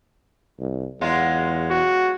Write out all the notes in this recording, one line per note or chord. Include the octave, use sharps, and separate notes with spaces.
C2
E2 F#3 G#3 F4
F#4